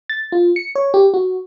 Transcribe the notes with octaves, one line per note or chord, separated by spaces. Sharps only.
A6
F4
C#7
C#5
G4
F#4